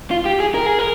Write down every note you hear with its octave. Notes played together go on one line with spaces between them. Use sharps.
F4
G4
G#4
A#4
G#4
A#4